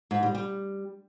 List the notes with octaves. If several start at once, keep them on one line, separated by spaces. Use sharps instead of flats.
G#2
G3
G3